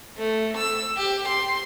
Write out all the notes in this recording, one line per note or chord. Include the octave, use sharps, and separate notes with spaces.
A3
E6
G4
C6